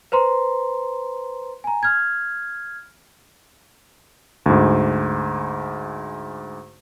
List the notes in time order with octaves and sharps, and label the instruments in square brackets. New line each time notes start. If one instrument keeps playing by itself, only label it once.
[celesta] B4 C5 A#5 C6
G#5 A#5
F6 G#6
[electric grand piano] D2 G#2